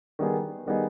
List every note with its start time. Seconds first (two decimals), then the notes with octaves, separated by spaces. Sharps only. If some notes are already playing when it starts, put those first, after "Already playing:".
0.19 D#3 G3 B3 D#4 G#4
0.66 D#3 G3 B3 D#4 G#4